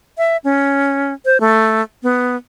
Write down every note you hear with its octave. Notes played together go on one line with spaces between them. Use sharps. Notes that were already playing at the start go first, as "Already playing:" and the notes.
E5
C#4
C5
A3
B3